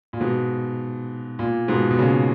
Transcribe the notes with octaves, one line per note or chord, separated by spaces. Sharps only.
A#2
G#2 B2
A#2
G#2 B2
B2
A#2 C#3